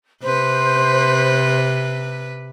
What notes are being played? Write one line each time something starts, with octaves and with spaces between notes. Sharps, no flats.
C3 B4 C5